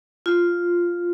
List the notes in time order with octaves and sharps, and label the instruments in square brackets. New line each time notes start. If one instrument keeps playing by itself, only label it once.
[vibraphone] F4